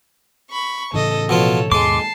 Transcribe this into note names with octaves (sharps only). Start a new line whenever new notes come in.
B5 C#6
A2 C#3 E3 A4 D#5
B2 F3 F4 A4 C#5
D#2 G#2 B2 G#3 A5 C6 D6 C7